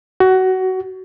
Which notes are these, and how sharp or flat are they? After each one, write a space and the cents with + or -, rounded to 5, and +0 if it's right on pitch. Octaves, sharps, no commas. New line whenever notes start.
F#4 +20